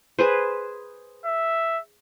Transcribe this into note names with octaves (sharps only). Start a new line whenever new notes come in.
G#4 B4 C5
E5